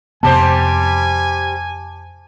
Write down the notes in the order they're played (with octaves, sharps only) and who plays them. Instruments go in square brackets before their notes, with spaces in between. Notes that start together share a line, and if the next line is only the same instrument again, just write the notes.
[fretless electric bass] F2 C3 B3 [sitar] G3 G4 C5 [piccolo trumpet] G#5 [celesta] A5